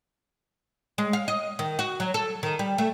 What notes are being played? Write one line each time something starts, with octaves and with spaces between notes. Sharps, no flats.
G#3
F5
D#5
D#3
F#4
F#3
A4
D#3
G3
A3